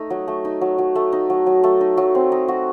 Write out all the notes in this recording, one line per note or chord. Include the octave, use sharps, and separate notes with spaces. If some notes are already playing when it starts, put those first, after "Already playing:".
Already playing: A3 D#4
F#3
A3
D#4
F#3
F#3
A3
D#4
F#3
F#3
A3
D#4
F#3
C4
D#4
F#4